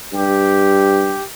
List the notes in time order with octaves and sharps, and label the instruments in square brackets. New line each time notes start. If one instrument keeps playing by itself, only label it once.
[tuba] G2 [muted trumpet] G4